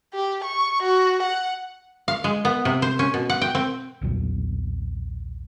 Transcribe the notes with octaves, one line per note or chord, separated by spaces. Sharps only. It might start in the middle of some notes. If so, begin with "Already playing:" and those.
G4
C#6
F#4
F#5
F5
G#3
B3
C3
C5
C#4
B2
F#5
G5
C4
B1 E2 A#2 F#3